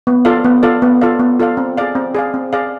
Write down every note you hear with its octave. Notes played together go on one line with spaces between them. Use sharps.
B3
F4 A4 D5 F5
B3
F4 A4 D5 F5
B3
F4 A4 D5 F5
B3
F4 A4 D5 F5
C4
G#4 D5 F5
C4
G#4 D5 F5
C4
G#4 D5 F5